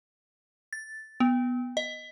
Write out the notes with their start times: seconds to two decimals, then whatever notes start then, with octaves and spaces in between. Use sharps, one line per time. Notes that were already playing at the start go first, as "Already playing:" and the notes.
0.73 A6
1.20 B3
1.77 D#5